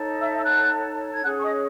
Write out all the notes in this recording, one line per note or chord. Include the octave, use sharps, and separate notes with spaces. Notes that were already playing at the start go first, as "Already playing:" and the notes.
Already playing: D#4 A4 C#5
E5 E6
E6
F#5 F#6
G#6
C#4 G#4 C#5 F#5 F#6
C#6
D#5 D#6